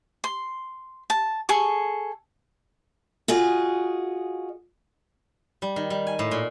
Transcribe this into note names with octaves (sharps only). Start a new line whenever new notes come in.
C6
A5
G#4 A4 C#6
F4 F#4 G#4 D#5
G3
D#3
G3
G#5
A2
A#2